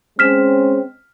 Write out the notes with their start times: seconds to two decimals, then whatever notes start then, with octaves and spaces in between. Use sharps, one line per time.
0.19 G#3 C4 C#4 F6 B6 E7